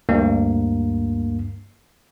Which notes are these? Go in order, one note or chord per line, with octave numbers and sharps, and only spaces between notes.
D2 G2 A#3